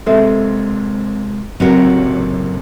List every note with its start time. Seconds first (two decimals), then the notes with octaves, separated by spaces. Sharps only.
0.07 C3 G#3 C4 A4 E5
1.60 F#1 A2 C3 F#3 C4 F#4 A#4